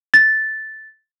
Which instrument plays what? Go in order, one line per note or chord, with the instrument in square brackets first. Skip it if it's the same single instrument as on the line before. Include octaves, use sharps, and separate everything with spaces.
[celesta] A6